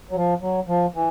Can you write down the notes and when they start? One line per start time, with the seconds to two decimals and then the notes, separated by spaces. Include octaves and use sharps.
0.11 F#3
0.16 F3
0.42 F#3
0.68 F3
0.95 E3